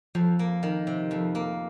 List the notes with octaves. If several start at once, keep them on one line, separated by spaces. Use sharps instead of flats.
F2 F3
A#3
D#3
C3
F2
A#3